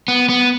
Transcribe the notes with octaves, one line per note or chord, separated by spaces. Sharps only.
B3
B3